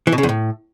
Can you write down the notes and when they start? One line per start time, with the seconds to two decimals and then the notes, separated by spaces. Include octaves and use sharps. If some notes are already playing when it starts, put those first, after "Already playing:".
0.07 E3
0.12 B2
0.18 C#3
0.23 E2
0.29 A2